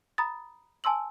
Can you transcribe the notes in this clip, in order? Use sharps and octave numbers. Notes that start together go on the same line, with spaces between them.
A#5 B5 D#6 A6
G#5 A5 C6 E6 F#7